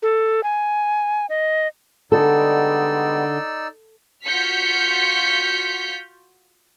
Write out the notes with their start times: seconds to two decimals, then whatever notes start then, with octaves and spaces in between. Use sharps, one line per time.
0.02 A4
0.43 G#5
1.30 D#5
2.12 D3 G3 G#3 B3 D#4 A4 D5 E6
4.25 F4 F#4 F6 G6 B6 C#7